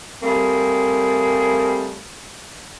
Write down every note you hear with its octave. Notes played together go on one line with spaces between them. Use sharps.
G3 A3 A#3 C4 G#4